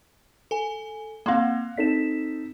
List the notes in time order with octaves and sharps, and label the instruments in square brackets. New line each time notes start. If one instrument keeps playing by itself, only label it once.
[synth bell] A4 G#5
[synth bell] A#3 C4 [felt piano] F5 F#5 C6
[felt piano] C4 D#4 A4 [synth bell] B6 E7